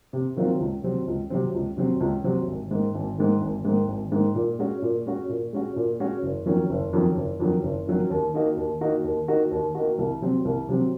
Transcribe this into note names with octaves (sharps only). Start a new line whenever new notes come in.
C3
D#3 F#3 C4 F4
C#2
C3 F#3 C4
C#2
C3 F#3 C4
C#2
C3 F#3 C4
C#2
C3 F#3 C4
G#1
G#2 D#3
G#1
G#2 D#3
G#1
G#2 D#3
G#1
G#2 D#3
A#2
G#3 C#4 F#4
A#2
G#3 C#4 F#4
A#2
G#3 C#4 F#4
A#2
G#3 C#4 F#4
F#1
F2 D#3 F#3 C#4
F#1
F2 D#3 F#3 C#4
F#1
F2 D#3 F#3 C#4
F#1
F2 D#3 F#3 C#4
D#2
D#3 A#3 D#4 F#4
D#2
D#3 A#3 D#4 F#4
D#2
D#3 A#3 D#4 F#4
D#2
D#3 A#3 D#4 F#4
C2
C3 F#3 C4
C2
C3 F#3 C4